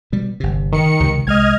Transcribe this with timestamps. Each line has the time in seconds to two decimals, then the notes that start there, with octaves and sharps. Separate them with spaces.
0.12 B2 G3
0.40 G1 C3
0.72 D#3 C#7
1.00 C#2 C3
1.27 C2 G#3 D#5 F6 G#6